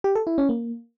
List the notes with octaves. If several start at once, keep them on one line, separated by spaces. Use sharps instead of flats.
G4
A4
E4
C#4
A#3